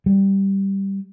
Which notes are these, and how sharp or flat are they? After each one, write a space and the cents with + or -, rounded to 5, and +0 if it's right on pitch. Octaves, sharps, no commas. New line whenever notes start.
G3 -5